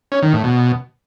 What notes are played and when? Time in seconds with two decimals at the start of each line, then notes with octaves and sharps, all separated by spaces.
0.12 C#4
0.22 D#3
0.33 A2
0.44 B2